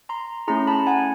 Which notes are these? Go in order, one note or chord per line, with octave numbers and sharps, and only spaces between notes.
A#5 C6
A3 C#4 E4 G#4 A#5 C6
A5 B5
F#5 G#5